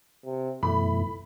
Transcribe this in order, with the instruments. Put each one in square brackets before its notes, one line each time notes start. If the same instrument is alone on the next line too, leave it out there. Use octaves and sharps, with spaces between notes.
[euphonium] C3
[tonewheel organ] F#2 B2 E3 [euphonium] A3 [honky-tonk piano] B5